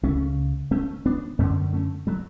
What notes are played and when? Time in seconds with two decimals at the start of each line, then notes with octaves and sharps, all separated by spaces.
0.03 C#2 C#3 A3 C#4
0.71 A3 C#4
1.06 B3 D4
1.39 F#2 D3 A3 C#4
1.73 A3 C#4
2.07 F#3 A3